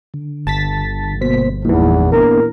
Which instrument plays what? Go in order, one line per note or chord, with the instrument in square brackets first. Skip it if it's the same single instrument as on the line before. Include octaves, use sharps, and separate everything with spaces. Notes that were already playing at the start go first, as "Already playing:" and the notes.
[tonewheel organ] D3
[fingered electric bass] G1 [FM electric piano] A5 A6 B6
[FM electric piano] B2 B6 [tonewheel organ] A#3 C5
[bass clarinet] E2 [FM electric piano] A#2 E3 [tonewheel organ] F3 G#3 D#4
[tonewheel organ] A#3 B3 D4 [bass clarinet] A#4